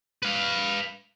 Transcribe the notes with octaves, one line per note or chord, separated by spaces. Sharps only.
B4 F5